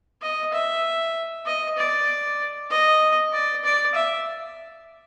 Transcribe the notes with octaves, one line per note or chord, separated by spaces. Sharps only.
D#5
E5
D#5
D5
D#5
D5
D5
E5